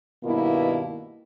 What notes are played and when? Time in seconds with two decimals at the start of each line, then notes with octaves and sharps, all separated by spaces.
0.24 G2 B2 D#3 A#3 B3 E4